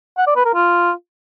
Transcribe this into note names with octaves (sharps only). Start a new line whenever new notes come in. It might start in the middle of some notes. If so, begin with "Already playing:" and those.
F#5
D5
B4
A#4
F4